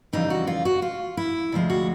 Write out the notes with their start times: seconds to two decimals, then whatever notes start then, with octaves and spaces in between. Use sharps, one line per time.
0.13 F2 C#3 E3 G3 D#4
0.30 F#4
0.47 F4
0.65 F#4
0.82 F4
1.17 E4
1.52 D2 C3 F3 G#3
1.70 F#4